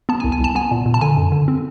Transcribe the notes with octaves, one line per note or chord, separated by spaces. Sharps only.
B3 A5
G#5
C2
G#5
C2 A5
B3 G#5
A#2
A#2
A5
D3 G#5
F#2
D3
C4